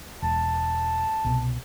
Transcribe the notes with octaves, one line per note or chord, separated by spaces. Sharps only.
E1 A5
C2 B2